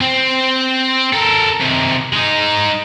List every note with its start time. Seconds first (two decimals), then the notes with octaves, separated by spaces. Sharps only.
0.01 C4
1.13 A4 A#4
1.60 C3 D#3
2.13 G#3 D#4